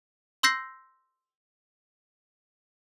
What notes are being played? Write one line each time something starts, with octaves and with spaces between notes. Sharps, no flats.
C6 E6 G6 A#6 C7